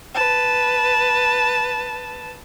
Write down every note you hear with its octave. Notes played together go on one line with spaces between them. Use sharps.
B4 A5